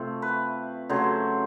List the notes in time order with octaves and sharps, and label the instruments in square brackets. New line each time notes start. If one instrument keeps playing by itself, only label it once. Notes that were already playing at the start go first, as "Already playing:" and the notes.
Already playing: [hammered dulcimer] C3 F3 A3
B4
C#3 F#3 A3 C5